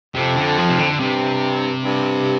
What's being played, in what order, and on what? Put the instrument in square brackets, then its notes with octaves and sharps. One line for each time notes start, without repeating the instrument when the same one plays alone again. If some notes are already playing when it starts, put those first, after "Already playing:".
[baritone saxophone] F2 [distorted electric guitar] C3
[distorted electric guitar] D3
F3
C3
D3
[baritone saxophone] G2 [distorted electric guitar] C3
[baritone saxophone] G2